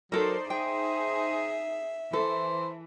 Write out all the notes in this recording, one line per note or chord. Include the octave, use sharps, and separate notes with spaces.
F#3 D#4 A4 A#4 C5 D5
D#4 G#4 C5 E5 G5
E3 A4 C5